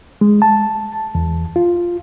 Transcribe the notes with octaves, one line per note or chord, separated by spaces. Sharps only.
G#3
A5
E2
F4